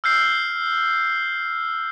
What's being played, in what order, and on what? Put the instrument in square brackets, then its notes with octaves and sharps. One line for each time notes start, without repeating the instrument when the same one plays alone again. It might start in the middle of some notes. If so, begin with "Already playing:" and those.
[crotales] E6 F6 G6 C7